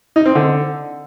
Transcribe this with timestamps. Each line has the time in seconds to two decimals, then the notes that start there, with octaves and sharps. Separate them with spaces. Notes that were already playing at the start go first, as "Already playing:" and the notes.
0.16 D#4
0.26 C4
0.35 D3